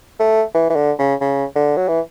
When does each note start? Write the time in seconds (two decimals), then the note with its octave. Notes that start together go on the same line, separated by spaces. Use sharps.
0.19 A3
0.54 E3
0.70 E3
0.76 D3
0.99 C#3
1.21 C#3
1.55 D3
1.77 F#3
1.88 E3